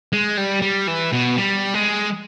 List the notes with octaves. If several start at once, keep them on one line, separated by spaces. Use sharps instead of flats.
G#3
G3
G3
E3
B2
G3
G#3